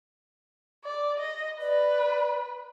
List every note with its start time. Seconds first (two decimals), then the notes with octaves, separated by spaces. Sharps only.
0.84 D5
1.19 D#5
1.61 B4 D5